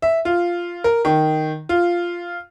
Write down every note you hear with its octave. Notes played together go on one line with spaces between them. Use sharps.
E5
F4
A#4
D#3
F4